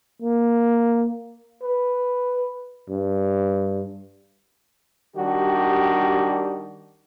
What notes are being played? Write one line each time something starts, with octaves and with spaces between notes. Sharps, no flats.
A#3
B4
G2
D#3 G3 D4 F#4 G4